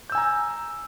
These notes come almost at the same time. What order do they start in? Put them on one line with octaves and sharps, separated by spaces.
G6 E6 G#5 A#5